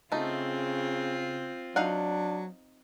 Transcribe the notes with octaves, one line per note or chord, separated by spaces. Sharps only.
C#3 A3 C4 D#4 F4
F#3 D4 D#4 F5 F#5